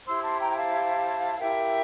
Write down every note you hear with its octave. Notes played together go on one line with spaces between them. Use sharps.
E4 G4 C5 C6 E6
A5 C6
G5 A#5
G5
F5 A5
E4 G4 A#4 E5 G5